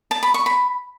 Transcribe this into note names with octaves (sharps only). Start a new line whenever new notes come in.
A5
B5
C#6
B5